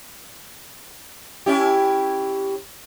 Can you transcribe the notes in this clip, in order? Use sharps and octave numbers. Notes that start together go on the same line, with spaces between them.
C#4 E4 G4